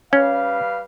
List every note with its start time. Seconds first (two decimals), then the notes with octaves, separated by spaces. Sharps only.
0.13 G3 C#4 B4 F5